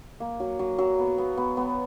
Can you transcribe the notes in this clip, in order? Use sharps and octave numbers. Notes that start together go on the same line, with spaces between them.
A#3
F#3
F#3
F#3
B3
B3
B3
B3